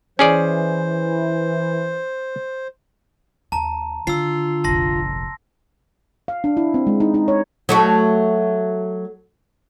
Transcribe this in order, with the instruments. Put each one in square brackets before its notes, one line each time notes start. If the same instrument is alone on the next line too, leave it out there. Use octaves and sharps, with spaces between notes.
[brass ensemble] E3 [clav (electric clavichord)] C#4 G#4 D5 [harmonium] C5
[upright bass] D#2 [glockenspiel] A5 A#5
[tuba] D3 [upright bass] D#3 [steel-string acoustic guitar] F4 [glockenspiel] E6 C7
[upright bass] F1 A#1 [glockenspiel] A5 C6 A#6
[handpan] F5
D4
E4
C4
G#3
D#4
D#4
C#5
[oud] F#3 A3 F#4